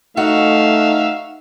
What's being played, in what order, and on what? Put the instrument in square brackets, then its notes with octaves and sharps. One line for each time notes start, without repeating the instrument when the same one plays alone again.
[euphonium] A3 [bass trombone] D#4 [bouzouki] F#4 [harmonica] E5 F5